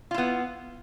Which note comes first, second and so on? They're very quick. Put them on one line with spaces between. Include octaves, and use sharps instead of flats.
F4 E4 B3